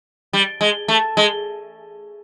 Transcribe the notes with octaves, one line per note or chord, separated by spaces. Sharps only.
G3
G#3
A3
G#3